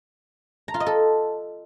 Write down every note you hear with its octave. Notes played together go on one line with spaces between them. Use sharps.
A#5
F4
D#5
A4